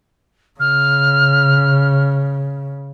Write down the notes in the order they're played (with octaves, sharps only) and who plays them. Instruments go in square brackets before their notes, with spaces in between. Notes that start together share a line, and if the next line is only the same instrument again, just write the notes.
[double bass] C#3 [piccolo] F6